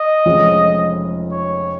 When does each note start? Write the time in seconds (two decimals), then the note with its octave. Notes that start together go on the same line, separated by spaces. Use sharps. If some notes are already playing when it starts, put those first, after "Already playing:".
Already playing: D#5
0.25 F1 F2 F3 G#3 C#4
1.32 C#5